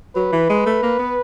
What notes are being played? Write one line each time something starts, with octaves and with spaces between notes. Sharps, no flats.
F#3 B4
E3
G#3
A3
A#3
B3